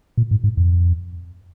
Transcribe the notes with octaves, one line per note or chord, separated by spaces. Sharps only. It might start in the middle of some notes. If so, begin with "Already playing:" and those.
A#2
G#2
G#2
F2